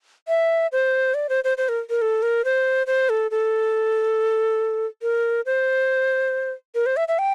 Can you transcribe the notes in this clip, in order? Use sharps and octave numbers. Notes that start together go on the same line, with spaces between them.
E5
C5
D5
C5
C5
C5
A#4
A#4
A4
A#4
C5
C5
A4
A4
A#4
C5
A#4
C5
E5
E5
G5